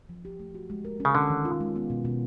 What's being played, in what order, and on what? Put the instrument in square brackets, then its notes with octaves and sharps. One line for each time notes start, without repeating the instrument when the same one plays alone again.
[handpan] F3
G4
A3
F#4
G#3
A#4
C#4
[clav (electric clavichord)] C#3
[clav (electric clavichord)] D3 [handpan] C#4
[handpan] D#3
F4
G#3
B3
B2
B2